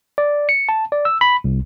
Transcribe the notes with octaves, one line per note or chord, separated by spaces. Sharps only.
D5
C#7
A5
D5
E6
B5
C2